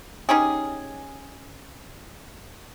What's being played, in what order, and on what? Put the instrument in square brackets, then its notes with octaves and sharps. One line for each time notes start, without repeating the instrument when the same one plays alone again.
[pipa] C#4 D#4 G4 G#4